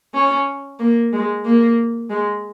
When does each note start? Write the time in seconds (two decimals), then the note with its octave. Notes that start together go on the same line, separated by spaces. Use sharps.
0.14 C#4
0.80 A#3
1.13 G#3
1.45 A#3
2.10 G#3